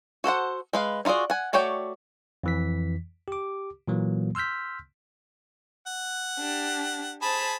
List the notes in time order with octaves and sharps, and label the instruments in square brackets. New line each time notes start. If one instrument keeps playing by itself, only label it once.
[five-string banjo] F#4 A4 C5 F#5
G#3 B4 F5
D#4 F4 F#4 G#4 D5
F#5 G#5
A3 F#4 C#5 D5 G5
[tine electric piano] F2 E3 B6
G4 D6
A#2 E3 F#3 A#3
C6 E6 F6 G6 B6
[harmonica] F#5
[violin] D4 G4
[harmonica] G#4 B5 [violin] C5 A5